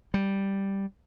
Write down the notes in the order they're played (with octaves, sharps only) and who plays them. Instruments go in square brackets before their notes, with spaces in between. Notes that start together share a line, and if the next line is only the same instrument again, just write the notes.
[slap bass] G3